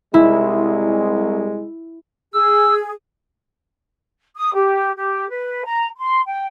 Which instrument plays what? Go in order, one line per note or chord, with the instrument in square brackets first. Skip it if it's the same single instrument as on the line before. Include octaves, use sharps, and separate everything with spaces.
[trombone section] C2 G#3 [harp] E4
[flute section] G#4 [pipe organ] E6
[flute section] D#6
G4
G4
B4
A#5
C6
G5